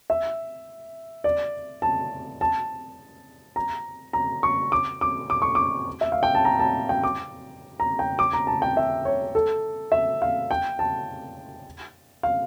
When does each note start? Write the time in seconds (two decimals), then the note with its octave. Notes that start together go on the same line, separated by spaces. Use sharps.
0.10 E5
1.24 D5
1.82 A5
2.41 A5
3.56 A#5
4.13 A#5
4.43 C#6
4.72 D6
5.01 D6
5.30 D6
5.42 C#6
5.55 D6
6.01 E5
6.12 F5
6.23 G5
6.35 A5
6.45 A#5
6.60 A5
6.89 G5
7.04 D6
7.80 A#5
7.99 G5
8.19 D6
8.33 A#5
8.47 A5
8.62 G5
8.77 E5
9.05 C#5
9.35 A4
9.92 E5
10.22 F5
10.51 G5
10.79 A5
12.23 F5